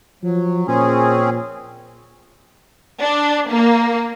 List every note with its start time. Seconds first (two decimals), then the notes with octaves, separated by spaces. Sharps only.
0.23 F3 F#3
0.68 A#2 C4 C#4 G#4
3.01 D4
3.52 A#3